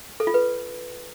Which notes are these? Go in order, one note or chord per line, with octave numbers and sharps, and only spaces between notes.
A4
F4
B4